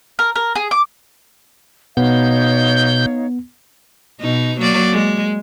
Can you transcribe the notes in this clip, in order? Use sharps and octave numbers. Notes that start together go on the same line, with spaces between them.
A#4
A#4
G#4
D6
B2 B3 D#4 C#5 F5 G6
B2 D#4
F#3 A#3 D5
G#3